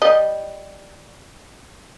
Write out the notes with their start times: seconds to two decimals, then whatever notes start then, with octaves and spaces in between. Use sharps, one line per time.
0.02 G3 D#5